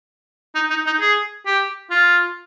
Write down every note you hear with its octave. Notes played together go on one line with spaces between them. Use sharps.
D#4
D#4
D#4
G#4
G4
F4